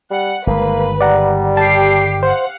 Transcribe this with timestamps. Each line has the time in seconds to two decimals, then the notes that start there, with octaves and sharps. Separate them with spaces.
0.10 G3 F#5
0.47 G1 D#3 G#3 A#3 B4
1.01 G3 D5 F#5 A#5
1.57 G4 A5 C7
2.23 C5 F5 F#5